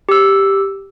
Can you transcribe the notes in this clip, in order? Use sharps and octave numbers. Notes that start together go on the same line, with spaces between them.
G4 E6